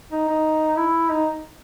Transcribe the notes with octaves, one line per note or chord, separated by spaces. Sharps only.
D#4
D#4
E4
D#4